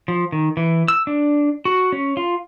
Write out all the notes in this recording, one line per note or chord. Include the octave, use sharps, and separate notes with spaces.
F3
D#3
E3
E6
D4
F#4
C#4
F4